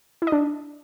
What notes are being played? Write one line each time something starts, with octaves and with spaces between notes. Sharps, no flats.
E4
D#5
D4